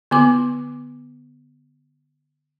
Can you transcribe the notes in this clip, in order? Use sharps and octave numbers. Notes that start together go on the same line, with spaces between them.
D3 B3 D6